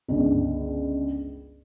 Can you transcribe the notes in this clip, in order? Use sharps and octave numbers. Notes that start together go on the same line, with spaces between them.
G1 C#2